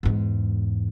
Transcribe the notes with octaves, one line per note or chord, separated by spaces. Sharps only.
E2 G#2